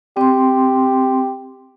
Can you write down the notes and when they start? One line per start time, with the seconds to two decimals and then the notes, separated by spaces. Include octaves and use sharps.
0.17 C4 G4 C6